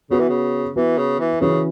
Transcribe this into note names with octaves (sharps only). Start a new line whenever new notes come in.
C#3 B3 F#4 B4
E3
C#3
E3 B3 F#4 B4
C#3
E3
C#3 E3 C#4 F#4 B4